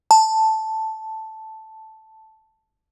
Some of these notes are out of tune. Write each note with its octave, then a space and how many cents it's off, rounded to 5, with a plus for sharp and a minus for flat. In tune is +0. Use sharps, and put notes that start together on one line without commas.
A5 +0